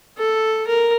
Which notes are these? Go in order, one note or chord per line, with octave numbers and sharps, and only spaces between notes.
A4
A#4